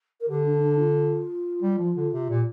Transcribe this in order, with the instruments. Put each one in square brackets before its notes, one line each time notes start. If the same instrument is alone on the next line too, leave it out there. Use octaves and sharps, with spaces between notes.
[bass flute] A#4
[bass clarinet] D3 [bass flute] G4
[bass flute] D4
D4
F4
[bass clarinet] G3
F3
D3
C3
[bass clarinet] A#2 [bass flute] G4